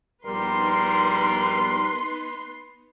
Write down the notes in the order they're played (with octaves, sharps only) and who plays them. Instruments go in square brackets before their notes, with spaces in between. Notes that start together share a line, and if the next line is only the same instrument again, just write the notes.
[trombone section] A#1 G3 A#4 [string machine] B3 D#4 [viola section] B4 C6